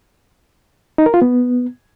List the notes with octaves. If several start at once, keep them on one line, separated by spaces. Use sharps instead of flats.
D#4
A#4
F4
B3